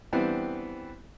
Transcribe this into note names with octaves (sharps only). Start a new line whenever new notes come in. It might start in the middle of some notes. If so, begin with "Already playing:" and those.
E3 G3 B3 C4 D4